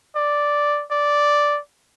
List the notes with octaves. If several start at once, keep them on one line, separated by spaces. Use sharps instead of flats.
D5
D5